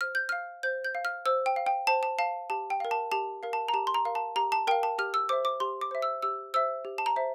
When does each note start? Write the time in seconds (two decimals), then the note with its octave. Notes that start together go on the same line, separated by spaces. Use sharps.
0.01 C5 F6
0.15 G6
0.29 F5 F6
0.63 C5 G6
0.85 G6
0.95 F5
1.05 F6
1.26 C5 E6
1.46 G5
1.56 F5
1.66 G5
1.87 C5 A5
2.03 A5
2.19 F5 A5
2.50 G4 A5
2.70 G5
2.80 A#4 F5
2.91 A5
3.12 G4 A5
3.43 A#4 F5
3.53 A5
3.68 A#5
3.74 G4 A5
3.87 C6
3.94 A#5
4.05 A#4 F5
4.15 A5
4.36 G4 A#5
4.52 A5
4.67 A#4 F5 G5
4.83 A5
4.98 G4 F6
5.14 E6
5.29 C5 E5 D6
5.45 D6
5.60 G4 C6
5.81 D6
5.91 C5 E5
6.02 E6
6.22 G4 E6
6.54 C5 E5 E6
6.85 G4
6.98 A5
7.06 A#5
7.16 C5 E5